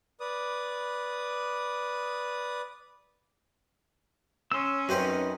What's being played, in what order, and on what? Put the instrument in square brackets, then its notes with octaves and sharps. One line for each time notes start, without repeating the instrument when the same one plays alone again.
[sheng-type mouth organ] B4 D5 D#6
[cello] C#4 [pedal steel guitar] C6 E6
[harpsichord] F#2 C4 C5 [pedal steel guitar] D#4 B4